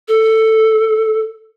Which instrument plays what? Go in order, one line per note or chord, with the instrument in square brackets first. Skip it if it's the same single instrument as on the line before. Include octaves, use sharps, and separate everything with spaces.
[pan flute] A4